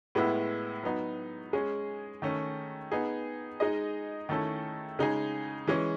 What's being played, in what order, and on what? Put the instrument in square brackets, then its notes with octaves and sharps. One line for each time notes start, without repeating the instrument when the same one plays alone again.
[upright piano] A2 G#3 B3 E4
F#3 B3 D#4
G#3 C#4 G#4
D#3 A3 C#4
B3 D#4 G#4
G#3 D#4 G#4 D#5
D#3 A3 C#4 E4 A4
C#3 G#3 D#4 G#4
E3 G#3 C#4 G#4